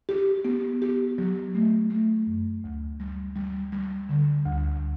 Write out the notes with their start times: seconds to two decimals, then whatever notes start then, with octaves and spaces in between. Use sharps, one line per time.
0.09 G4
0.45 B3
0.82 G4
1.18 F#3
1.55 A3
1.90 A3
2.27 F#2
2.64 D2
3.00 G3
3.36 G3
3.72 G3
4.09 D3
4.46 D2